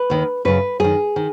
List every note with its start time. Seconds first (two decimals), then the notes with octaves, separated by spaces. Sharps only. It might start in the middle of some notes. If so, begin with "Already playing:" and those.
Already playing: B4
0.10 D#2 D#3
0.45 F#2 C#3 B4
0.79 F#2 D#3 G#4
1.16 D#3